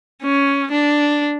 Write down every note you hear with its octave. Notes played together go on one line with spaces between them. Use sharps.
C#4
D4